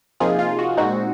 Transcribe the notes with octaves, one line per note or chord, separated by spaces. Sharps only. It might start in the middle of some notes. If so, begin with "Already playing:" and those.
C3 F3 A#3 D#4 F4 G#4
F4
F#4
A#2 G#3 C4 D#4 F#4